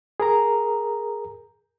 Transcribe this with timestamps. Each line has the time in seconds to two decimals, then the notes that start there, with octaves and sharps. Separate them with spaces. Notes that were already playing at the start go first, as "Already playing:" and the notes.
0.20 G#4 A#4 A#5